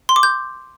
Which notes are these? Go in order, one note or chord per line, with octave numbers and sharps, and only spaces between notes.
C6
D6
G6